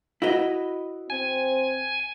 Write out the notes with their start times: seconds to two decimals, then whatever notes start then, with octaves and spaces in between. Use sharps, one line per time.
0.22 E4 F#4 B4 D#5
1.10 C4 G#5